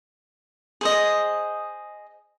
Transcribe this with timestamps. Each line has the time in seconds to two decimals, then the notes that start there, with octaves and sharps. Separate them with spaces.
0.81 G#4 C5 D#5